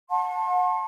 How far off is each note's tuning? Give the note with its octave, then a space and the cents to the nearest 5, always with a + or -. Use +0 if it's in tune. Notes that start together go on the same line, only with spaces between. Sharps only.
F#5 -35 A5 +0 C6 +40